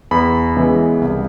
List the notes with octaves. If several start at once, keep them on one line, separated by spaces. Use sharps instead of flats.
E2 B5
C#3 E3 G#3 B3
C2